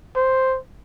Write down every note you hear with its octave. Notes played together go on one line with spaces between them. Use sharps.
C5